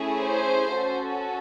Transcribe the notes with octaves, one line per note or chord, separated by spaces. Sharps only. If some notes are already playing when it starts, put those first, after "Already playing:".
Already playing: A3 C#4 E4 G#4
C5
C#4 F#4 A4